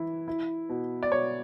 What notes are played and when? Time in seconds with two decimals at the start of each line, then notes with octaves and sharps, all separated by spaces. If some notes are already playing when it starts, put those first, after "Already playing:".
Already playing: E3 E4
0.28 E4
0.69 B2
1.03 D5
1.12 B2 C#5